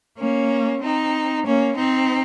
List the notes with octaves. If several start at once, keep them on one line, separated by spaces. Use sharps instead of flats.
A#3 C#4
C4 D#4
A#3 C#4
C4 D#4